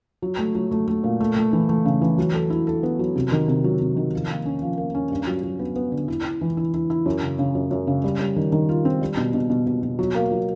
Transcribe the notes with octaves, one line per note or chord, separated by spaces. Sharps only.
F#3
A3
F#3
A3
A3
A#2
A3
A3
E3
A3
C#3
E3
F#3
A4
E4
A4
B3
F#3
C3
D#3
C3
F#3
C3
D#3
F3
A#3
C#4
F3
A#3
C#4
G2
F#3
F#3
B3
B3
D3
E4
E4
E3
E4
E4
E4
F#2
C#3
C#3
F#2
F#2
C#3
G3
G3
D#3
D#3
F4
C4
G3
B2
B2
B2
B2
B2
F#3
A#3
F#3